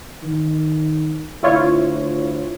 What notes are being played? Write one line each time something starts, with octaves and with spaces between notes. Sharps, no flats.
D#3
D2 E4 F4 C#5